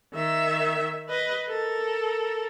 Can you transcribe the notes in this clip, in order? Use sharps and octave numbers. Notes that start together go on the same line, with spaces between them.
D#3 E5
B4 D#5
A4 A#4